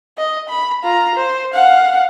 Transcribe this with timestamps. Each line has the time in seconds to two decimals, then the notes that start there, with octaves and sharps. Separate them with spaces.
0.18 D#5
0.49 B5
0.84 F4 A#5
1.15 C5
1.53 F5 F#5